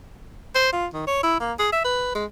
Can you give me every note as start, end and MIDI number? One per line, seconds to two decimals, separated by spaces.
0.55 0.72 72
0.73 0.86 65
0.93 1.07 51
1.07 1.20 73
1.23 1.37 64
1.40 1.53 58
1.59 1.68 68
1.73 1.80 76
1.84 2.13 71
2.15 2.25 56